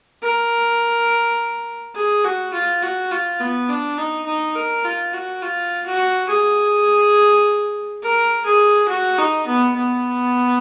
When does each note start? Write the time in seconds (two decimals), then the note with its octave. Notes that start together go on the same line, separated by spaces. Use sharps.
0.22 A#4
1.95 G#4
2.24 F#4
2.54 F4
2.82 F#4
3.11 F4
3.40 B3
3.69 D4
3.98 D#4
4.27 D#4
4.56 A#4
4.85 F4
5.13 F#4
5.42 F4
5.86 F#4
6.29 G#4
8.02 A#4
8.46 G#4
8.89 F#4
9.18 D#4
9.47 B3
9.76 B3